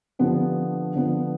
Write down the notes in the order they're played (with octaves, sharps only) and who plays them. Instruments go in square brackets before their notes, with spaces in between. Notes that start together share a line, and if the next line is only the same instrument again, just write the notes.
[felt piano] D3 F3 B3 D4 G4
D3 F3 B3